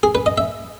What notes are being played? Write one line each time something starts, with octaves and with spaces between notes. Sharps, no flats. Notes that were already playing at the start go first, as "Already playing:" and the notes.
G#4
B4
D#5
E5